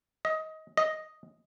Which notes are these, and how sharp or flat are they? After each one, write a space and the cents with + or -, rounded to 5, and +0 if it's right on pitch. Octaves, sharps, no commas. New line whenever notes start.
D#5 +20
D#5 +0